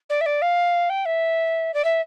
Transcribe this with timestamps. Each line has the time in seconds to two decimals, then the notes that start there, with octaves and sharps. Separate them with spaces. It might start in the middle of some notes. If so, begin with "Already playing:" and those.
0.09 D5
0.21 E5
0.26 D5
0.41 F5
0.89 G5
1.05 E5
1.74 D5
1.84 E5